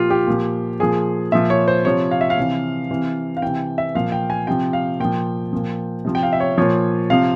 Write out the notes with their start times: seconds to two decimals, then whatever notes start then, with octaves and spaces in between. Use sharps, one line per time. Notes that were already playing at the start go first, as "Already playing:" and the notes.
Already playing: A#2 F3 F4 G4
0.10 G4
0.27 A#2 F3
0.80 A#2 F3 G#4
1.32 A#2 F3 E5
1.50 C#5
1.68 C5
1.85 C3 F3 C#5
2.11 F5
2.21 E5
2.30 F5
2.37 C3 E3
2.90 C3 E3
3.37 F5
3.42 C3 E3 G5
3.78 E5
3.95 A#2 F3 F5
4.12 G5
4.30 G#5
4.47 C3 F3 G5
4.73 F5
5.00 A#2 F3 G5
5.53 A#2 F3
6.05 C3 F3
6.15 G5
6.23 F5
6.33 E5
6.40 C#5
6.58 A#2 F3 C#5
7.10 C3 F3 F5